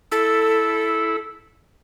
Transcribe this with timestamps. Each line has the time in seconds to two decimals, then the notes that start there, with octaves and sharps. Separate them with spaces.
0.12 E4 A4